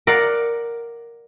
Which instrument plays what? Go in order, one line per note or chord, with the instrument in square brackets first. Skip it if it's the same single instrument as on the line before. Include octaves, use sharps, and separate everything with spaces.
[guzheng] A#4 D5 F5 F#5